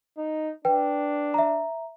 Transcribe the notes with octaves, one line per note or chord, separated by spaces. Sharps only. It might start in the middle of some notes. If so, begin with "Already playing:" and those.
D#4
D4 B4 G5
E5 A#5